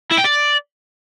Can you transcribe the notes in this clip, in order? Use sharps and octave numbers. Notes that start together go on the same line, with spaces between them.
E4
G5
D5